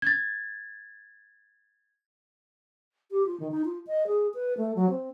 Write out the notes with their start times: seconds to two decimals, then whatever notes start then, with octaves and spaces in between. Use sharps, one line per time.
0.02 G#6 A6
3.11 G4
3.26 F4
3.40 D#3
3.51 D#4
3.65 F4
3.87 D#5
4.07 G#4
4.34 B4
4.58 A3
4.75 F#3
4.90 C4